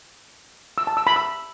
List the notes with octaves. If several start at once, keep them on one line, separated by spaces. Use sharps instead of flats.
E6
A5
E6
B5
E6